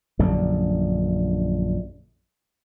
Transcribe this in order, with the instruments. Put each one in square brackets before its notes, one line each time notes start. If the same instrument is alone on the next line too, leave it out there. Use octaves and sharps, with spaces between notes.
[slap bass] A#1 F#2 D3 G3